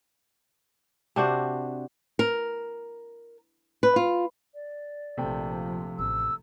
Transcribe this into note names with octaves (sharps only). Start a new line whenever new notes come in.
C3 D4 F#4 C5
A#4
B4
F4
D5
A#1 C3 F3 A3 G5
A1 E6